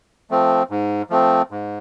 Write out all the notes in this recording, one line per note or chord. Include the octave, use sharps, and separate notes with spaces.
F3 A3 C4
G#2
F3 A3 C4
G#2